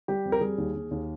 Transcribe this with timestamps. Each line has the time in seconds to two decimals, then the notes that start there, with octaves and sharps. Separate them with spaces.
0.08 G3 G4
0.25 F2
0.32 A#4
0.41 G3 G#4
0.58 D#2
0.75 D#2
0.91 D#2